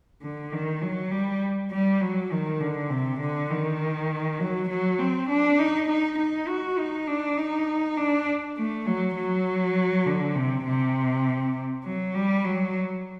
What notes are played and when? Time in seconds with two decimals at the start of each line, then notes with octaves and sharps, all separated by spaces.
0.22 D3
0.52 D#3
0.82 F#3
1.11 G3
1.71 G3
2.01 F#3
2.31 D#3
2.60 D3
2.90 C3
3.20 D3
3.50 D#3
4.40 F#3
4.69 F#3
4.99 C4
5.29 D4
5.59 D#4
5.89 D#4
6.19 D#4
6.48 F#4
6.78 D#4
7.07 D4
7.38 D#4
7.97 D4
8.57 A3
8.87 F#3
9.16 F#3
10.06 D3
10.35 C3
10.66 C3
11.84 F#3
12.15 G3
12.45 F#3